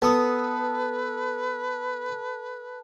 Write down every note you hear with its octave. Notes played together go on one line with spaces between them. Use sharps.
B3 A4 B4 D#6